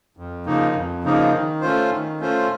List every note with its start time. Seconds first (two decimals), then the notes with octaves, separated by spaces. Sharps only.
0.17 F2
0.46 C#3 F3 A#3 D#4
0.75 F2
1.04 C#3 F3 A#3 D#4
1.33 D#3
1.61 A3 C#4 F4 C5
1.90 D#3
2.20 A3 C#4 F4 C5